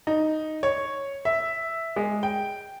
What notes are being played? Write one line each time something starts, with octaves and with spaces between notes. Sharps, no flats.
D#4
C#5
E5
G#3
G5